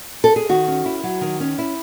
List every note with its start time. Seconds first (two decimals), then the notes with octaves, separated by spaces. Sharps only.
0.24 A4
0.36 G#4
0.49 D#3 F#4
0.68 C#4
0.86 E4
1.04 F#3
1.21 D#3
1.40 C#4
1.58 E4